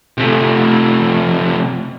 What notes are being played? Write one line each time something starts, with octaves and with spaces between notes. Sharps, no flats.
C3 A3